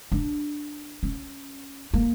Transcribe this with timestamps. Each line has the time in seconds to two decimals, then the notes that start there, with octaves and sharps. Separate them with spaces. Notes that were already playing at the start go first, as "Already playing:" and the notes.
0.12 D4
1.03 C#4
1.94 A#3